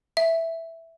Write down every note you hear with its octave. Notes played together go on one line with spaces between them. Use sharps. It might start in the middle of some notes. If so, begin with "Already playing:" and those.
E5